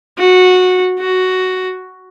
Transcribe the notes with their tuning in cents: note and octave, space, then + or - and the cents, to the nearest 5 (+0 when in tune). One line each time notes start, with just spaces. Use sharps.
F#4 -15
F#4 +5